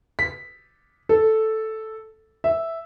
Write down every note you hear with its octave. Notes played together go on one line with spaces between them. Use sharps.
B6
A4
E5